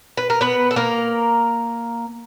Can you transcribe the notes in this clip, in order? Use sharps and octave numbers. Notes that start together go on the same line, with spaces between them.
B4
A#4
B3 B4
A4
A#3 A#4